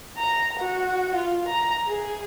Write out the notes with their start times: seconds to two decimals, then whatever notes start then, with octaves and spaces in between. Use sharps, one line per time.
0.18 A#5
0.59 F#4
1.15 F4
1.48 A#5
1.87 G#4